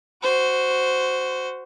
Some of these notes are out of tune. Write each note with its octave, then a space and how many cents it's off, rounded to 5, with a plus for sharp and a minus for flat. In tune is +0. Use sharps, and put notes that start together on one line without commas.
F#4 +0 C5 -10